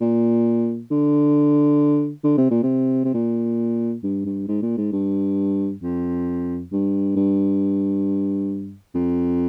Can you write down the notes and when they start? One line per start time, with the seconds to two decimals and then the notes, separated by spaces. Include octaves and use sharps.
0.01 A#2
0.91 D3
2.24 D3
2.38 C3
2.51 A#2
2.63 C3
3.04 C3
3.14 A#2
4.03 G2
4.25 G2
4.48 G#2
4.62 A#2
4.77 G#2
4.92 G2
5.82 F2
6.72 G2
7.16 G2
8.94 F2